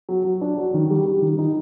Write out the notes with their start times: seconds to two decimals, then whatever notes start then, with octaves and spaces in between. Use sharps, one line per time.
0.09 F#3
0.25 F#3
0.41 D4
0.58 F#3
0.74 D#3
0.90 G3
1.06 G3
1.22 D#3
1.39 D#4